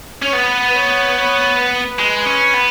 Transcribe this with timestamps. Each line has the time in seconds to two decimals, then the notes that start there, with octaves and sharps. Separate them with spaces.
0.22 C#4 C#5
0.33 B3 B4
0.69 B4
0.74 C#5
1.08 B4
1.15 C#5
1.57 B4
1.99 G#3
2.26 C#4
2.54 B3